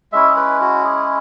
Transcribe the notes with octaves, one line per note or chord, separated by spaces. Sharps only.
G#3 C#4 E4 E5
G#4
B4
F#4
G#4